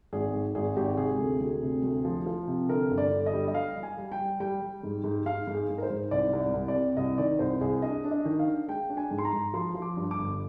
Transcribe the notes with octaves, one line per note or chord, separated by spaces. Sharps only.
G#1 G#4
G#2
G#1 G#4
G#1 G4
G4
C3 G#4
D2
D2
C3
D2
F3
F3
C3
D3 A#4
G1
D5
D3
D#5
G3
D#5
G3 F5
G3
G#5
G3
G5
G3
G3 G5
G3
G#2
G#2
G#2 F5
G#2
G#4
G#2
A#4
C5
G#2
C2 D5
C2
D5
C2
D5
C3
C2 D#5
D#3 D5
C2 C5
C2 G#4
D4 D#5
D4
D#5
D#3
F5
D4
G#3 G5
D4
G#5
G#2
C6
A#5
G#2
F3 C6
F3
D6
G2
D6
G1